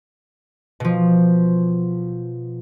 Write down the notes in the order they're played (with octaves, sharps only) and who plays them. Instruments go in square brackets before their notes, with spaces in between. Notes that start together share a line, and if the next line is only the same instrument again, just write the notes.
[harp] B2 F3